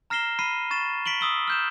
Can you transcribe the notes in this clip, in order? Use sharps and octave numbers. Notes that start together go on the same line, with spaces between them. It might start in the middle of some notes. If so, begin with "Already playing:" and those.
A#5 F6 A#6 C7 E7 G7
B5 F6 C7 D#7
C#6 A6 E7
B6 D7 F#7 G7
D#6 E6 G7
F6 G6 E7